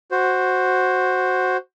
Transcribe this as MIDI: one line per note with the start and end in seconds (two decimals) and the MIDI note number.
0.11 1.57 66
0.11 1.57 72